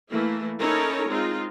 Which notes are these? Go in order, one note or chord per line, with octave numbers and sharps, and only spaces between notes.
E3 A3 A#3 E4
C#4 D#4 E4 A4 A#4 C#5
G#3 C4 D#4 F4